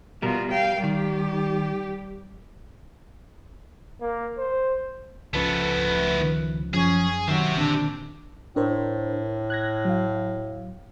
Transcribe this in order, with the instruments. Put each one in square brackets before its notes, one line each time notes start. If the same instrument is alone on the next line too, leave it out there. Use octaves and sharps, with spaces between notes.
[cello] B2 F4 [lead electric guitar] G3 A#4
[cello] F5 G5
[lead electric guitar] D#3 [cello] G3 G4
[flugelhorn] A#3
C5
[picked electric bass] C#2 F3 C#4 [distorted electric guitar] A3 B3 [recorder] B4
[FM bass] D#3
[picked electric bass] F#2 [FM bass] F3 [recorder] C#4 [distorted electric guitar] G#4
[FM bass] D#3 [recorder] F#3 [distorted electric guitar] G4 E5
[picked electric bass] A#2 D3 C4 [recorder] D4
[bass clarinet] A2 [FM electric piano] D4 A#4 C5
[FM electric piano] F#6 G#6 A#6
F#3 F5